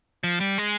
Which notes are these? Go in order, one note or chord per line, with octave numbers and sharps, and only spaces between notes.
F3
G3
G#3